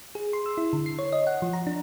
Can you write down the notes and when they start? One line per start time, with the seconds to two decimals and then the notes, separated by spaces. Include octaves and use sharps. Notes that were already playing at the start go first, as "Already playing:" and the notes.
0.15 G#4
0.33 C6
0.46 E6
0.58 E4
0.73 D3
0.86 C7
0.99 C#5
1.13 D#5
1.27 F#5
1.42 F3
1.53 A#5
1.67 D4